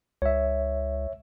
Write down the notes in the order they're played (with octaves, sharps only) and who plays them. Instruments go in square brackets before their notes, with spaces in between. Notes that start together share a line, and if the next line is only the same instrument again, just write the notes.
[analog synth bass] C#2 [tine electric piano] C#5 E5